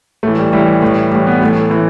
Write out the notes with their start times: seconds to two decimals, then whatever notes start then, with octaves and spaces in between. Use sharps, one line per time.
0.23 A2 E3 A3
0.38 G3
0.53 A2 E3 G3
0.82 A2 E3
1.11 A2 E3 G3
1.27 B3
1.40 A2 E3 A3
1.70 A2 E3